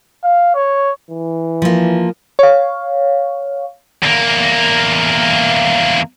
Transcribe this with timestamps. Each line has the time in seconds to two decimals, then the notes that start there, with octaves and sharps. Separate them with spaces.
0.24 F5
0.55 C#5
1.11 E3
1.62 F3 A#3
2.39 C#5 F5
4.03 E2 A#3